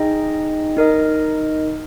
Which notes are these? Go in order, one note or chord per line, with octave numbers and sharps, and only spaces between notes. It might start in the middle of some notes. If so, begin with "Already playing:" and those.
Already playing: D#4 G#4 D#5 G5
D#4 A#4 D#5